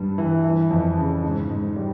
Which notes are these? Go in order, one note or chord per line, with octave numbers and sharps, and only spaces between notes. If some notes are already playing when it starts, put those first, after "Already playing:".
Already playing: G2 G3
E3
E3
F2
C#3
G#2
G#2
G3